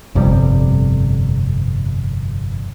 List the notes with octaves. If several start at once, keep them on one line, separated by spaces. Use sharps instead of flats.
G1 F2 C3 G3